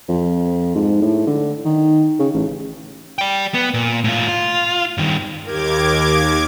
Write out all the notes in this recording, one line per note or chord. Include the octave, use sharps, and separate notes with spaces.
F2
G#2
A2
D3
D#3
C#3
A1
D5 G5
B3
A#2
A2 F4
F4
G2 D#3
D#2 G4 A#4 D6 G#6